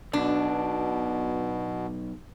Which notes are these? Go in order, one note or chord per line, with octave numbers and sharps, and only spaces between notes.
B1 B2 D4